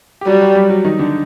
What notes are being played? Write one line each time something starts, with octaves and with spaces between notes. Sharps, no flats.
G4
F#3 G3 F#4
F#3 F#4
G3 G4
F#3 F#4
D#3 D#4
D3 D4